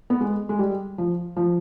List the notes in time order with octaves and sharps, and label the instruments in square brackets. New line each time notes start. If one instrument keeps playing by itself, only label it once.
[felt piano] B3
G#3
G#3
G3
F3
F3